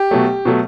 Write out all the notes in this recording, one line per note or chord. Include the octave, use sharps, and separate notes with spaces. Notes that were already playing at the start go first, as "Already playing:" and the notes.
Already playing: G4
B2 F#3 A3
B2 F#3 A3